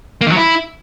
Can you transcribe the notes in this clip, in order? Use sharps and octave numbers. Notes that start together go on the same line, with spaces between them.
A#3
D#3
F#3
E4